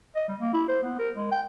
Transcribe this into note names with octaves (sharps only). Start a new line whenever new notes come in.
D#5
G3
A#3
E4
C5
B3
A#4
G#3
G5